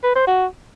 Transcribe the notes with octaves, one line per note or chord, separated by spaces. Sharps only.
B4
C5
F#4